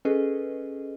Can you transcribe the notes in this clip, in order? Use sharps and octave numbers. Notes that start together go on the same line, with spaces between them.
C#4 G#4 A4 B4 D#5